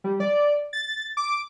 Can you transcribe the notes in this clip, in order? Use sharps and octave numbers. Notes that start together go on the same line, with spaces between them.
G3
D5
A6
D6